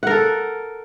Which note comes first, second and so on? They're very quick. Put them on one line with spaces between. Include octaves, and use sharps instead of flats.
F#5 A#4 A4